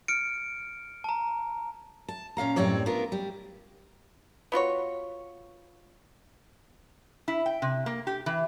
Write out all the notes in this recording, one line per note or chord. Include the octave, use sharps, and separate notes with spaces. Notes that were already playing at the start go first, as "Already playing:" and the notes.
F6 C#7 D7
A5 A#5
A5
A#2 C#4 F5 A#5
F#2 A2 G3 C4 C#5 D5
B3 D4 F4 A#4
G3
B3 F4 F#4 C#5
E4
G5
C3
A#3
G4
E3